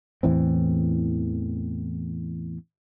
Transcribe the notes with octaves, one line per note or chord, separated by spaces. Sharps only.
E2 A2 E3 C4